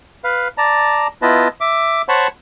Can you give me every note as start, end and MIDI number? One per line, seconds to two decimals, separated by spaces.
0.24 0.48 71
0.24 0.48 77
0.58 1.08 74
0.58 1.08 81
0.58 1.08 82
1.22 1.48 59
1.22 1.48 64
1.22 1.48 65
1.22 1.48 71
1.22 1.48 75
1.22 1.48 81
1.61 2.02 76
1.61 2.02 86
2.09 2.28 72
2.09 2.28 73
2.09 2.28 78
2.09 2.28 81
2.09 2.28 83
2.09 2.28 85